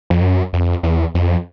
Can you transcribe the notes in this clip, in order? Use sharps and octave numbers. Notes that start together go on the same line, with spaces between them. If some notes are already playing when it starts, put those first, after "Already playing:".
F2
F#2
F2
E2
F2